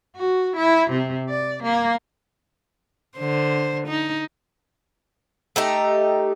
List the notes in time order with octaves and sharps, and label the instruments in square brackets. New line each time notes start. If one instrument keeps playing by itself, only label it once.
[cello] F#4
E4
C3
D5
A#3
[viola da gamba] D3 C5
D#4
[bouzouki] A3 D#4 G4